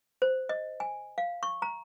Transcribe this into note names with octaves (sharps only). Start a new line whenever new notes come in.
C5
D#5
G#5
F5
C#6
A#5